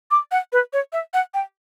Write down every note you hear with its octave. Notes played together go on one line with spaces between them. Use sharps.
D6
F#5
B4
C#5
E5
F#5
G5